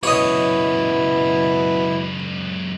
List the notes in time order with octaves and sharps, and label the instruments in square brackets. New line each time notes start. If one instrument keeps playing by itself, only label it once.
[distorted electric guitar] C#2 F#2 [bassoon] B2 [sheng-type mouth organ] E4 [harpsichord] C#5 D#5